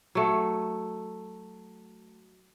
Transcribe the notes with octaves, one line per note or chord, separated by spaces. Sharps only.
F#3 A3